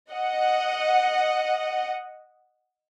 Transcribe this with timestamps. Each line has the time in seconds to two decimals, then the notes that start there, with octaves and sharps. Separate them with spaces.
0.12 D#5 F#5